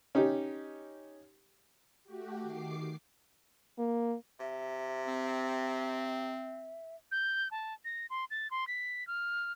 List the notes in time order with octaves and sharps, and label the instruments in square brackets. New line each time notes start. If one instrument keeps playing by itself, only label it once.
[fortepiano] C#4 D#4 G4
[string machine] A3 F#4 G4
D#3 D6 C7
[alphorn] A#3
[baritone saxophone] C3 [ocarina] E5
[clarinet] C4
[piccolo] G6
A5
A#6
C6
A6
C6
B6
F6